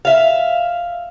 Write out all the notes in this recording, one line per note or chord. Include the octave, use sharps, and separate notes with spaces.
E5 F5